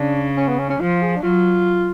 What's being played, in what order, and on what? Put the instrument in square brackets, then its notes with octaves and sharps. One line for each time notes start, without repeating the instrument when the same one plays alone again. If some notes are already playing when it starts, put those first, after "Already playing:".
Already playing: [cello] C#3 [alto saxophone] D4
[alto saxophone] C#4
B3
C#4
C#4
[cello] F3 [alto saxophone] F4
[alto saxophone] G#4
D4
[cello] F#3 [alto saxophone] F4